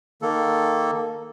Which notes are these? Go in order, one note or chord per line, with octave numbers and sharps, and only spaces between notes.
D#3 A#3 A4